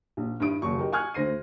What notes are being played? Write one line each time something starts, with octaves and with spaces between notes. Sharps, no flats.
A#1
G2 D#3 E4 D#6 D7
F#1 D#2 F#3 C#6
G4 A#4 D#5
G#5 C#6 D#6 F6 F#6 G#6
D2 C5 A#6 C7 D#7